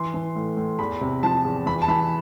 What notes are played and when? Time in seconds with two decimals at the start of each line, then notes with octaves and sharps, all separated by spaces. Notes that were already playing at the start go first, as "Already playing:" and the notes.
Already playing: E3 C6
0.14 E3
0.36 A2
0.57 A2
0.79 E2 B5
1.01 C3
1.23 F3 A5
1.44 E2
1.66 E3 B5
1.82 A5
1.88 E3 B5